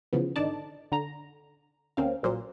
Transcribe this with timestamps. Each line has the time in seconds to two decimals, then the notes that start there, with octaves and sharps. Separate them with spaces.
0.13 C#3 E3 F3 B3
0.36 G#1 D3 D#4 D5 A5
0.92 D3 A#5
1.97 D2 A#3 C4 C#4 F5
2.23 A#1 A#2 F#3 C5